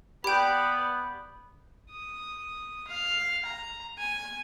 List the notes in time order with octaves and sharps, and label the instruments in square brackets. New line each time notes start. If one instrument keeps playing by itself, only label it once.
[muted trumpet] B3 [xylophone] G4 G5 [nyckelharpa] B4 D5 [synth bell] B5 G6
[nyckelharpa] D#6
F5
A#5
G#5